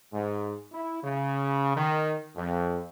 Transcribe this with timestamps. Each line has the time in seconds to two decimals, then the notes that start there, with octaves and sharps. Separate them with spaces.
0.12 G#2
0.71 E4
1.03 C#3
1.76 D#3
2.36 F2